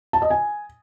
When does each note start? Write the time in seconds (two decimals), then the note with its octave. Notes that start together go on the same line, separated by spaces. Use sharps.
0.13 A5
0.22 D#5
0.30 G#5